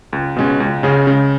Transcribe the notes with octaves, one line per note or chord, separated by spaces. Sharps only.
C#2
B2 G#3 C#4
C#2
C#3 G#3 C#4 G#4
C#3